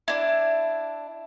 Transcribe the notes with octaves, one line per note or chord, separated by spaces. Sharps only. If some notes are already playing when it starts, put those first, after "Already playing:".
D4 E4